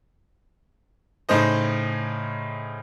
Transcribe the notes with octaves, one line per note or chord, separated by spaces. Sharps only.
A2 C#3 D#4 C5 D#5